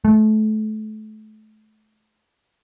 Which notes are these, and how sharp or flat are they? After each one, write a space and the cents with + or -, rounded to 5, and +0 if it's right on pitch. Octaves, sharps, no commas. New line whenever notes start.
A3 -30